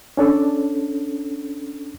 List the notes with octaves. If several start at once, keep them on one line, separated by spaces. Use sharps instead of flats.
C#4 D4 A4